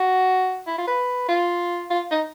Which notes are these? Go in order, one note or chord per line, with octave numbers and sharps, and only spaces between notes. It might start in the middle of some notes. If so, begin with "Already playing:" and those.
Already playing: F#4
E4
F4
B4
F4
F4
D#4